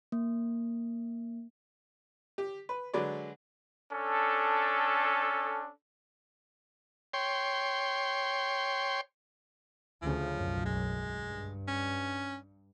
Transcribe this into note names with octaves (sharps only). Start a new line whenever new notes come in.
A#3
G4
B4
D3 F#3 G#3 B4 D5
C#4 D4 A4
C#5 G5 C6
D2 C#3 F3
B1 F#2
G#3
G2
C#4